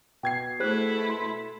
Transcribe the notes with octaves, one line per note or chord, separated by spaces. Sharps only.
B2 G5 G#6 C7
A3 E4 G#4 C5 F#6
C6